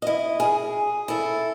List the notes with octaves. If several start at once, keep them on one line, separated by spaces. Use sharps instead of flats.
E4 D#5
G#4
E4 A4